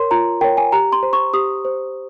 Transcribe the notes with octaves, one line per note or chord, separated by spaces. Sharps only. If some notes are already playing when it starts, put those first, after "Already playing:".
Already playing: A#4 C#5 C6
F4 A#5
A#4 C#5 G5
G#5
G4 A#5
C6
C5
C#6
G4 D#6
C5